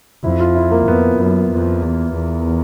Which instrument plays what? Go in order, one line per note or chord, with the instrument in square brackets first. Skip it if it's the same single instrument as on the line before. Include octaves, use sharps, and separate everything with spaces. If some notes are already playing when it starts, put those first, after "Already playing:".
[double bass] F2 [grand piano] E4
[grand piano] F4
E4
A#3
[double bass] F2 [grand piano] B3
[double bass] F#2 [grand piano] B3
[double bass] F2
E2
E2